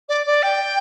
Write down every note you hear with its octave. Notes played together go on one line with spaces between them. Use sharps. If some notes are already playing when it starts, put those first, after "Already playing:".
D5
D5
G5